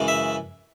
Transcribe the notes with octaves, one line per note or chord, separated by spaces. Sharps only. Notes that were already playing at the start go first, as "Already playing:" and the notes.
Already playing: F#2 C#3 E3 G#3
E5